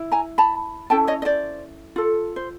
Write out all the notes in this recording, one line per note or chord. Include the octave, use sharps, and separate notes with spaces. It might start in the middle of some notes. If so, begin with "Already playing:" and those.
Already playing: E4
G#5 A#5
A5 B5
C#4 E4 A4 G5 A5
C#5 D#5
D#5
C5 D5
F4 A4
C5